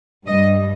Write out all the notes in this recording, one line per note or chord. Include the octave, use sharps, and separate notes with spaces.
G2 G3 D#5